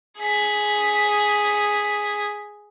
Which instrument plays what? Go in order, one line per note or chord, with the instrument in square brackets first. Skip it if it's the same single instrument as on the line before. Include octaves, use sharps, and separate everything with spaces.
[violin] G#4 B6